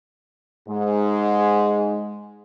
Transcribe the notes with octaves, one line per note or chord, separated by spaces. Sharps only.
G#2 G#3